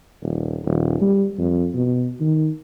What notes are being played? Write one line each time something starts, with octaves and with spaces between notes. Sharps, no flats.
D#1
D#1
G3
F2
B2
D#3